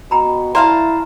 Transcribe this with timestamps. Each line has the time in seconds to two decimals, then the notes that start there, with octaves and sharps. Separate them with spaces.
0.11 B2 G5 A#5 B5
0.55 E4 C5 D5 F5 A5 A#5